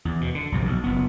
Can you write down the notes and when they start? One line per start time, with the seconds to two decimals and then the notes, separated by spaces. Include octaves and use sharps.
0.05 E2
0.21 B2
0.35 D3
0.52 A#1 G2 C3 F3
0.65 B1
0.84 F#1 B3